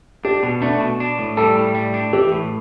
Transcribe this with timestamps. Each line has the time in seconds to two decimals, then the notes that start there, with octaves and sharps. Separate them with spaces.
0.25 D4 G4
0.43 B2
0.62 A3 D4
0.80 B2
1.00 D4
1.19 A2
1.37 G3 A4
1.56 A2
1.75 G3
1.94 D4
2.13 E3 G4
2.32 A2